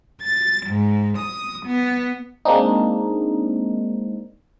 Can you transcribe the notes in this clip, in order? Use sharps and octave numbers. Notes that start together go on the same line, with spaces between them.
A6
G#2
D#6
B3
G#3 A#3 C4 D4 D#4